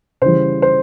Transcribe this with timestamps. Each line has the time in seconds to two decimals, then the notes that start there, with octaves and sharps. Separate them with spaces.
0.22 C#3 E3 G3 C5
0.62 C5